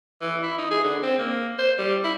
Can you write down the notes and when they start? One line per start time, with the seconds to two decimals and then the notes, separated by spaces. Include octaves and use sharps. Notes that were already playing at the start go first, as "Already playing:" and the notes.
0.22 E3
0.43 E4
0.58 D#4
0.71 G#4
0.84 D3
1.03 C4
1.19 A#3
1.58 C5
1.78 G3
2.04 E4